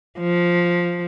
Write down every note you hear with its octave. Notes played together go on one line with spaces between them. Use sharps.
F3